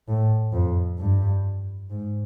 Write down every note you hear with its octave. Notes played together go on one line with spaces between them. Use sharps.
A2
F2
G2
G#2